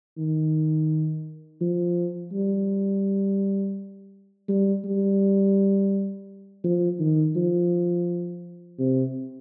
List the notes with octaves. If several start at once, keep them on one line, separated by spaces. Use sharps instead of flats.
D#3
F3
G3
G3
G3
F3
D#3
F3
C3